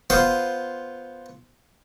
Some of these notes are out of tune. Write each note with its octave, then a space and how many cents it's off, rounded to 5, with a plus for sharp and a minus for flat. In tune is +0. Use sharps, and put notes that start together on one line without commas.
B3 +0 F4 +0 C5 +0